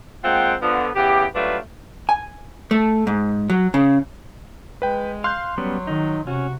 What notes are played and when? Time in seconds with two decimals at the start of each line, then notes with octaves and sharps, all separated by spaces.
0.24 G#3 A#3 C4 F4 F#5 G5
0.61 D3 F3 B3
0.95 C#3 E3 B3 G4
1.34 F#3 G3 A3 D4 F4 B4
2.09 G#5
2.71 A3
3.07 G#2
3.50 F#3
3.74 C#3
4.82 G#3 B4 G5
5.24 F5 C6 F#6 G6
5.58 F#3 G3 B3 C#4
5.87 D#3 D#4
6.27 C3 C#4 F#4